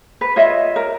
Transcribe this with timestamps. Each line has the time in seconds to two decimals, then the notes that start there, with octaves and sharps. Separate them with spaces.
0.21 B4
0.36 F4 C#5 D#5 E5
0.76 A#4